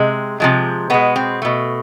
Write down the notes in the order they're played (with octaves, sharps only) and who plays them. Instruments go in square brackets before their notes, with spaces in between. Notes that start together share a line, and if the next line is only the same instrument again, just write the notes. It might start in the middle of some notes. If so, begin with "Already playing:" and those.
Already playing: [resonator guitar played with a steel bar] C3 G#3
C3 F3 G#3
B2 G#3 B3
C4
B2 A3